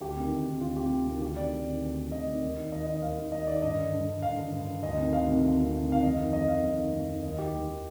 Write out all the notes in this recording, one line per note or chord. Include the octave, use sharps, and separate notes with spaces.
D2 G4
C3 D#3
D2
C3 D#3
D2 F4
C3 D#3 G4
D2
C3 D#3
D2 G4
C3 D#3 D5
D2
C3 D#3
D2
C3 D#3
D2 D#5
C3 D#3
D#2
D#3
D#2 D#5
D#3 D#5
D#2 F5
D#3
D#2 D#5
D#3 D5
G2 D#5
D3
G2
D3
G2 F5
D3
G2
D3
D2 D#5
C3 D#3
D2 F5
C3 D#3
D2
C3 D#3
D2
C3 D#3 F5
F2 D#5
D#3
F2 D#5
D#3 F5
F2
D#3
F2
D#3
D#2 D#5
D#3 G4
D#2
D#3